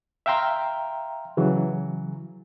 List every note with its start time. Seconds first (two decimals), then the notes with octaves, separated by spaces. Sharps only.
0.26 E5 F5 G5 A#5 C6
1.37 C#3 E3 F#3